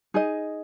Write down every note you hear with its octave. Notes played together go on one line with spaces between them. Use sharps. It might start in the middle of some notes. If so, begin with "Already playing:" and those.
D#4 G#4 D#5